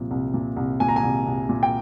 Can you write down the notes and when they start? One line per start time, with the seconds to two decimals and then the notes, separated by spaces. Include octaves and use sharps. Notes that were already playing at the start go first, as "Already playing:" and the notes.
Already playing: C2 A#2 F3
0.11 C2
0.34 A#2
0.56 C2
0.80 A#2 G#5
0.89 A#5
0.96 G#5
1.03 C2
1.26 C2
1.49 A#2
1.63 G5